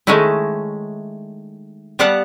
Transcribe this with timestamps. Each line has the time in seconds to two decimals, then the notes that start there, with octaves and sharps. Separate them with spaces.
0.07 D#3 G#3 A3 C#4 D#4 E4
1.99 G3 B3 G4 F5 F#5 A5